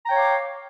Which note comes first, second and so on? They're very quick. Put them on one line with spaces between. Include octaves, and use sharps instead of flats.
A#5 G5 C#5 F5 D6